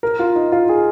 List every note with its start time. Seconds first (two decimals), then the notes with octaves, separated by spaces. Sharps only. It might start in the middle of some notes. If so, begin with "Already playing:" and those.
0.03 A#4
0.19 F4
0.36 D#4
0.52 F4
0.69 G#4